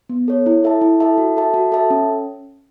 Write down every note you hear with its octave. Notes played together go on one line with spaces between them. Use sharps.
B3
A4 C#5
E4
A4 E5 A5
E4
A4 E5 A5
F#4
A4 E5 A5
F#4
A4 E5 A5
C#4